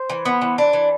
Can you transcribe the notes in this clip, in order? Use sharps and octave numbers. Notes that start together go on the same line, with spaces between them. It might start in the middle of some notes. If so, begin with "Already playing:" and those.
Already playing: C5
E3
B3
E3
D4
E3